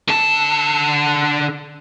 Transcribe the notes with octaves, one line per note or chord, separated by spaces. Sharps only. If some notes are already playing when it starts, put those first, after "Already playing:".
D3 A5